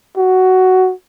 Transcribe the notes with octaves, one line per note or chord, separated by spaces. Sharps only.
F#4